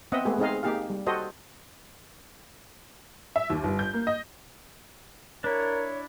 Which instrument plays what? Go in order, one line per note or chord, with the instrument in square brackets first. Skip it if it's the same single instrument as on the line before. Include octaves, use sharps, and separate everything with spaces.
[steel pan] B3 C4 D#5 E5 F#5
G#3 A3 B3 G4 G#4
G#3 C4 D#4 G#4 D#5 F5
A#3 D#4 G4 G#4 F5
G3
F#4 G4 A4 C5 D#5
[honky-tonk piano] E5
D#2
G1
G6
A#3
D#5
[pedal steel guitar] D4 E4 [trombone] A#4 [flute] C#5